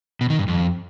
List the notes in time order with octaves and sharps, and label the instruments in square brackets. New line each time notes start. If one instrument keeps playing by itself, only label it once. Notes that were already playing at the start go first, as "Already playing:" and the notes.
[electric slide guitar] B2
D#3
G2
F2